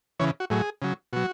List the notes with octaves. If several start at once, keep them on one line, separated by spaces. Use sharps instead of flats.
C#3 E3 C#5
F#4
A2 F#3 G#4
C#3 F#3
B2 F#3 F#4